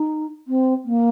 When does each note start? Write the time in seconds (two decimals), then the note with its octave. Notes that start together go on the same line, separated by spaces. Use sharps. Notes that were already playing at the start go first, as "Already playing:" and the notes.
Already playing: D#4
0.48 C4
0.85 A#3